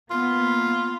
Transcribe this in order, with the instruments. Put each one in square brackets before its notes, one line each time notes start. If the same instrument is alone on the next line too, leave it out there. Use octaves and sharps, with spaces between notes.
[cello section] A#3 B3 [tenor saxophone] F4